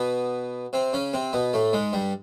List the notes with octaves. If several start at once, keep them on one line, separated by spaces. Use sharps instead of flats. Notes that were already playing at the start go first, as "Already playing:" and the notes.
Already playing: B2 B3
C3 C4
C#3 C#4
C3 C4
B2 B3
A2 A3
G#2 G#3
G2 G3